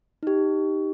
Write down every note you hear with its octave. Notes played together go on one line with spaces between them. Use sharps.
D#4 G4